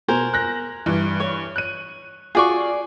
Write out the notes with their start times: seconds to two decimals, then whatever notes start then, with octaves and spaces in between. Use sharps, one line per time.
0.08 B2 A#4 C5 G#5
0.34 F#6 A#6
0.86 G2 E3
1.20 C#5
1.56 F#6 D#7
2.35 F4 F#4 G#4 D5 C#6